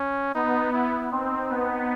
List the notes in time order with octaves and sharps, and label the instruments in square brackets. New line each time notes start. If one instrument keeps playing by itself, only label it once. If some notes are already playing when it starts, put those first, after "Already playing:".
Already playing: [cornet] C#4
[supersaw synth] B3 [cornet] D#4
[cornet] E4
[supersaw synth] C4 [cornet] D#4
[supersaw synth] B3